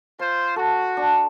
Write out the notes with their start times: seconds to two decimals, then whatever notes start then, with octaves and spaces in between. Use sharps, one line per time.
0.19 F4 C5 C6
0.56 F#4 A4
0.97 D4